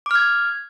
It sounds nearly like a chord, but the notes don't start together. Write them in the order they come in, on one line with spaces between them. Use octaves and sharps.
D6 F6 G#6